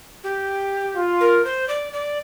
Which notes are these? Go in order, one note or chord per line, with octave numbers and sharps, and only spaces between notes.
G4
F4
A#4
C5
D5
D5